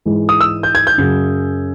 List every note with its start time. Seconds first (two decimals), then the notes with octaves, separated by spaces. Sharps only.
0.05 G#2 E3 G#3
0.29 D#6
0.41 E6
0.63 G6
0.75 G#6
0.87 G6
0.98 F#2 C#3 F#3